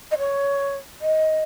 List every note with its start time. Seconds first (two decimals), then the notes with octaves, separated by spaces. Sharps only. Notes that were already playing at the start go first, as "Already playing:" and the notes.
0.11 D#5
0.18 C#5
1.01 D#5